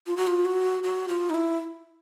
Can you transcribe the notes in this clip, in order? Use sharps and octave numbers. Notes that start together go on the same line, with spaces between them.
F4
F#4
F4
F#4
F#4
F4
D#4
E4